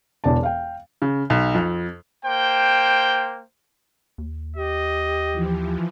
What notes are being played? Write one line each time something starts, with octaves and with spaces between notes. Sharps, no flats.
E1 E2 D5 A5
F5 G5
C#3
B1
F2
A#3 C5 G5
D#2
G4 D#5
E3 F3